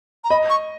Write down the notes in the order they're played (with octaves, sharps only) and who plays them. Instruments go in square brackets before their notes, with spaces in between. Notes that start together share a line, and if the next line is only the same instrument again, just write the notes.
[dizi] A#5
[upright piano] D#5 [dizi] B5
[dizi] C#6